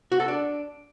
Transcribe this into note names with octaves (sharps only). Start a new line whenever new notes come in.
F#4
A4
D4